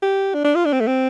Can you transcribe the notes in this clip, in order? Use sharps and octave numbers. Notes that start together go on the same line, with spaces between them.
G4
D4
D4
F4
D4
C4
A3
C4